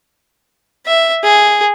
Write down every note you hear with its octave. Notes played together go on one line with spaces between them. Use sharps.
E5
G#4